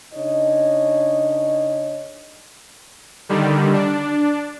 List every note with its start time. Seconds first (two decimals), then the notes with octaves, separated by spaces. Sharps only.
0.14 C#3 D4 D#4 C#5 D#5
3.29 D3 D#3 G3
3.73 D4